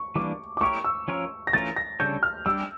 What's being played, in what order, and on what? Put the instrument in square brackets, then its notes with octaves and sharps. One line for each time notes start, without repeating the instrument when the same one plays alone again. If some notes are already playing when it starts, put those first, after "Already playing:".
Already playing: [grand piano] C#6
[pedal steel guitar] E3 G3 A#3 D4 [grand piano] D6
[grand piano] D6
[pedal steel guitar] A3 E4 G4 A#4 C#5 [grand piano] C#6
[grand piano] E6
[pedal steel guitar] F3 C#4 F4 A#4 C#5
[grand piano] A#6
[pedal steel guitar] E3 A3 C#4 F4 A#4 [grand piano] A6
[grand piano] A#6
[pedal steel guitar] C#3 G3 D4 A4 C#5 [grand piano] G6
[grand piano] F6
[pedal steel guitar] G3 D4 G4 [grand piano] E6